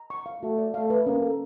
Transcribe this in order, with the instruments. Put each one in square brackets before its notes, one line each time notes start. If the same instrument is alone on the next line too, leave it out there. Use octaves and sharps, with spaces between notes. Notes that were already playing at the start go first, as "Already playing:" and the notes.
Already playing: [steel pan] A#5
C#6
F5
[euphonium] A3 [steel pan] F#4
[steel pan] D5
[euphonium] A3 [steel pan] F5
[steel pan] B4
[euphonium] A#3 [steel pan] C#4
[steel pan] A4